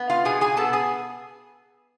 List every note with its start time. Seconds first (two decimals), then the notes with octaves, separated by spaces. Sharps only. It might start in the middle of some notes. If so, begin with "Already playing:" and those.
Already playing: B3
0.10 F4 F5
0.25 B2 G#4 G#5
0.41 G#4 G#5
0.57 B3 A4 A5
0.73 G#4 G#5